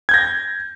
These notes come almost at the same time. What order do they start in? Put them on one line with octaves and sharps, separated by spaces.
G#6 G6 A#6